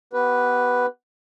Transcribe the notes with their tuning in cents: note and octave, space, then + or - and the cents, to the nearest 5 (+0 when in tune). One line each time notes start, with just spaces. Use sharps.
B3 +0 G4 -20 B4 +0